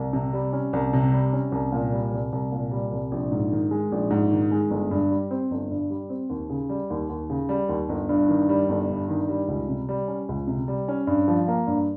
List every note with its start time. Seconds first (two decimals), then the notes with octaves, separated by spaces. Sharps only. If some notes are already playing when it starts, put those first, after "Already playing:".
Already playing: C2
0.13 C3
0.33 G3
0.53 C#4
0.73 C2
0.93 C3
1.12 G3
1.33 C#4
1.52 C2
1.72 A#2
1.93 G3
2.12 C2
2.32 C2
2.52 A#2
2.71 G3
2.92 C2
3.12 A#1
3.32 G#2
3.52 D#3
3.71 G#3
3.92 A#1
4.10 G#2
4.30 D#3
4.51 G#3
4.70 G1
4.91 G2
5.11 G3
5.31 C4
5.51 G1
5.71 G2
5.90 G3
6.10 C4
6.30 D#2
6.50 C#3
6.69 G3
6.90 D#2
7.10 D#2
7.30 C#3
7.49 G3
7.69 D#2
7.89 G1
8.09 G2
8.29 D#3
8.49 G3
8.69 G1
8.89 G2
9.09 D#3
9.29 G3
9.48 C#2
9.68 C3
9.89 G3
10.08 C#4
10.29 C#2
10.47 C3
10.68 G3
10.88 C#4
11.07 G2
11.28 F3
11.48 A#3
11.67 G2